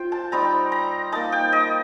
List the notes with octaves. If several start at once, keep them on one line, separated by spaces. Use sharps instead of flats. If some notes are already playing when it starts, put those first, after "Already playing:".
Already playing: F4 C5 G5
A5
G3 C4 D#4 A#5
A#5
A#3 D#4 A5
G5
D#5